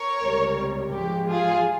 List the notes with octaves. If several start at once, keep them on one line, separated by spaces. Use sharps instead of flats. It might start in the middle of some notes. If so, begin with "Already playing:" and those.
Already playing: A#4 C#5
C#2 C3 G3
G#2 F3 G#3 G4
F4 G#4